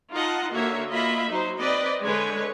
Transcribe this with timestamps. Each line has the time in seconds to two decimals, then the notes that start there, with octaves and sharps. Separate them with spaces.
0.12 D#4 F4 D#5 F#5 A5
0.53 D3 A#3 F#4 C#5 E5
0.90 A#3 F4 D#5 E5 B5
1.29 F#3 D#4 C5
1.58 C4 B4 D5 D#5
2.03 D3 G#3 B4 C#5